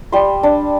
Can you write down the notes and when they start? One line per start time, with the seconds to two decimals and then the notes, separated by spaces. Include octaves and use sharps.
0.12 G3 C6
0.43 D4